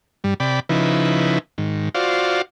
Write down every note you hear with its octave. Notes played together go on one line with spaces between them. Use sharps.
G2 G3
C3 D5 G5 B5
C#3 F3 D#4 E4 B4
G#2 D#3
F4 F#4 C5 D5 F5